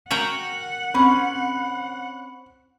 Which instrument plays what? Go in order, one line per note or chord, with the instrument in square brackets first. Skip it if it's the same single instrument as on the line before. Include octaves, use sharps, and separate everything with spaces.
[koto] F#4 A#4 G5 [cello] F#5
[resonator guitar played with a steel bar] C4 C#4 [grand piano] B5